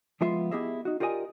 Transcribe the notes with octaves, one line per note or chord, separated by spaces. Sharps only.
F3 G#3 B3 F4 E5 C6
B3 E4 G4 G#4 D#5 E5
D#4 F#4
F4 G4 A#4 D5 D#5 G#5